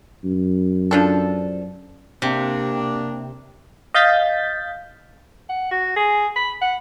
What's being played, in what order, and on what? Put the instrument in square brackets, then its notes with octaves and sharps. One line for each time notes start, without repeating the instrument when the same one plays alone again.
[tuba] F#2
[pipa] F3 D4 A4
[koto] C3 [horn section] A#3 D4
[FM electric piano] D#5 F5 G6 A6 B6
[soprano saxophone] F#5
F#4
G#4
B5
F#5